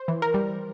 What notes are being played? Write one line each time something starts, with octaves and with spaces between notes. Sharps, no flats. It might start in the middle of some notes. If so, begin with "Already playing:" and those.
Already playing: C5
E3
A#4
G3